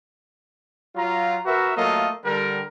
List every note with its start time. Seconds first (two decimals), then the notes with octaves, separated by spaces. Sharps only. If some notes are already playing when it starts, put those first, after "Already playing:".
0.96 F#3 F4 A#5
1.46 F#4 A#4 B4 E5
1.76 F#3 A3 A#3 F4 A4 D#5
2.24 D3 G3 A#4